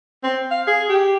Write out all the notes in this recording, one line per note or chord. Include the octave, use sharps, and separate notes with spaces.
C4
F5
G#4
G4